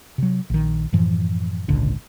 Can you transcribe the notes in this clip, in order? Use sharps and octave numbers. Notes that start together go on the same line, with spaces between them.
C3 F#3
A#1 D#3
F#2 A2 E3 F3
G#1 C#2 A#2 D3